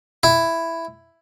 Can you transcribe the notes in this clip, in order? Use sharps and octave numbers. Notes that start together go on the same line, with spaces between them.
E4